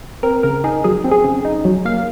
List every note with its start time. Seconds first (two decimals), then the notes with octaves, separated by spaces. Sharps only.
0.23 C4 A#4
0.43 C#3 A#4
0.64 D#4 G#4
0.84 F#3 G#4
1.04 C4
1.11 G#4
1.24 C#3
1.45 D#4
1.65 F#3
1.85 A#3 F5